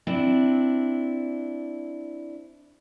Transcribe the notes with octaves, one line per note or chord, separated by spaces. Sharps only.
C4 D4 E4